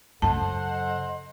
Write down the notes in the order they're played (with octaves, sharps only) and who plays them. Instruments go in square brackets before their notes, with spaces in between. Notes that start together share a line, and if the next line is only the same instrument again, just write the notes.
[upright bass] F#2 C#3 [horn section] A4 C5 F#5 [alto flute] D#5 [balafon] A5